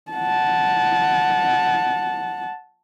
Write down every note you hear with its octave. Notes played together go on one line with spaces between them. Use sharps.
F#5 A5